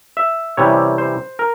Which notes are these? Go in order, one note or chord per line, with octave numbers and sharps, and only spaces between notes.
E5
C3 E3 G3 C#4 E4 C#5
C5
A#4